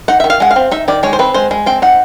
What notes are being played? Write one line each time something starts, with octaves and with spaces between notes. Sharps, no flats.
D#4 F#5
D#3 E5
F5
G#3 F#5
F5
C4
D#4 E5
D#3 D5
G#3 C#5
C5
C4 B4
G#3 C5
G#3
C4 G5
D#4 F#5